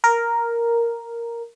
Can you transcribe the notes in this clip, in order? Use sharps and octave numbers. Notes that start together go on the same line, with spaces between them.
A#4